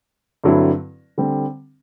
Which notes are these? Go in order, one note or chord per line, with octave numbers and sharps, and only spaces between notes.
G2 D3 F#3 C4 E4
D3 G3 C4